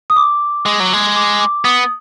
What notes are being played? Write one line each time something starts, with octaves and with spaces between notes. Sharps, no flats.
D#6
D6
G#3
F#3
G#3
D6
D6
B3 D#6